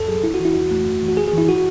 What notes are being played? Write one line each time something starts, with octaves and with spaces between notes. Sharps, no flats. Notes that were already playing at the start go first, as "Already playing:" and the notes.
Already playing: F#2 A4
F#3 G#4
C#2 E4
F#4
E3
E4
E2 F#4
A3
F#2
E3
F#4
F#2 G#4
G#4
E3 E4
F#4